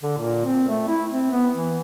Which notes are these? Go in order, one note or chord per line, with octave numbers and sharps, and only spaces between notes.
D3
A#2
C4
A3
E4
C4
B3
E3